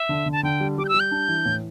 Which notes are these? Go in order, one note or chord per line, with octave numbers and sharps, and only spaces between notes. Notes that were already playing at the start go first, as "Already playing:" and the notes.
Already playing: E5
D3
D3
A5
D3 G5
G3
G3 D6
G6
E6
G3
G6
D4
E3
A2